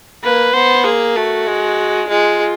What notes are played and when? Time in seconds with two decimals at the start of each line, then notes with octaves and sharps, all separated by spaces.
0.23 A#3 B4
0.54 B3 C5
0.85 A#3 G#4
1.16 A3 F#4
1.47 G#3
2.09 G#3 F4